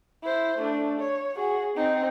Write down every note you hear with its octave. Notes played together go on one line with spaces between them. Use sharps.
E4 C5
A3 D4
C#5
F#4 G#4
C4 D#4